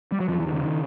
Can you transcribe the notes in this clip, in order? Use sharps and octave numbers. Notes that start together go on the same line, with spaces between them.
G3
F#3
E2 F3
E3
D#3
C#3
D#3